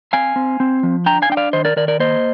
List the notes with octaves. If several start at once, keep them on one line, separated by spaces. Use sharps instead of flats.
C4 F5 G#5
C4
C4
F3
D4 G5 A#5
F5 G#5
D4 G5
D5 F5
D#3 C5 D#5
A#4 D5
D#3 A#4 D5
A#4 D5
A#3 C5 D#5